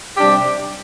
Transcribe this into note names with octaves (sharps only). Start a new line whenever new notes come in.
C3 G3 D4 G4